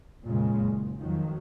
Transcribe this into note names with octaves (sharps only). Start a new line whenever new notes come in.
F2 A#2 C#3 G#3
F#1
F2 D#3 F3 F#3